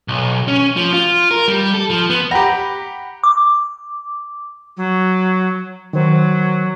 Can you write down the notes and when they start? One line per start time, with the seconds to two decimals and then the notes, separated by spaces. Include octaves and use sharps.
0.08 B1
0.48 C#4
0.76 F3
0.94 F4
1.31 A#4
1.48 G3
1.74 A4
1.90 F3
2.10 B3
2.31 G4 F#5 G5 A#5 B5
3.24 D6
4.77 F#3
5.93 D#3 F#3 C5